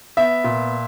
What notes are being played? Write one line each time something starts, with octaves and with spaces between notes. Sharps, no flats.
B3 E5
A#2